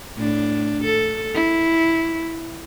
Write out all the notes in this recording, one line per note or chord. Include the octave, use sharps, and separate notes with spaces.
A2 D4
A4
E4